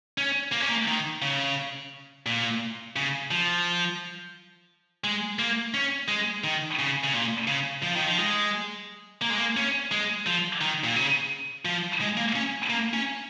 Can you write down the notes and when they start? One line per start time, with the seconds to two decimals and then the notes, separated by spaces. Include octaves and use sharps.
0.18 C#4
0.52 A#3
0.60 C#4
0.69 A#3
0.87 D#3
1.22 C#3
2.26 A#2
2.96 C#3
3.31 F3
5.04 G#3
5.39 A#3
5.74 C#4
6.08 G#3
6.44 D#3
6.79 C#3
7.04 C#3
7.14 A#2
7.47 C#3
7.83 F3
7.96 D#3
8.07 F3
8.18 G#3
9.22 A#3
9.30 G#3
9.38 A#3
9.57 C#4
9.91 G#3
10.26 F3
10.61 D#3
10.84 A#2
10.96 C#3
11.65 F3
12.01 G#3
12.17 A#3
12.36 C#4
12.70 A#3
12.94 C#4